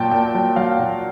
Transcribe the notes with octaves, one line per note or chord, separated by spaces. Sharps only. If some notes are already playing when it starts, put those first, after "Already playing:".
Already playing: A#2 F#3 G5 A5
A#2 G5
F#3
F#3 F5
A#2